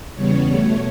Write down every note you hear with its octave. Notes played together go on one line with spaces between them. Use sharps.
E2 C#3 G3 B3 C#5
B2 A3